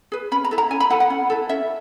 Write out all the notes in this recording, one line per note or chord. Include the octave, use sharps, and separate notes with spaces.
G#4 B4
C#4 B5
A#5
E4 A4
A#5
C#4 G#5
B5
E4 A4 F#5
F#5
C#4
E4 A4
C#4 E5